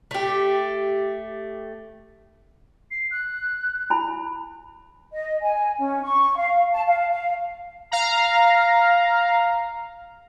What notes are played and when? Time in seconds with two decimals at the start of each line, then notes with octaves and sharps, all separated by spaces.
0.11 A3 G4
2.91 C7
3.11 F#6
3.90 E4 G#5 B5
5.13 D#5
5.41 G#5
5.77 C#4
6.04 C#6
6.36 F5
6.72 A5
6.86 F5
7.10 F5
7.92 F5 A#5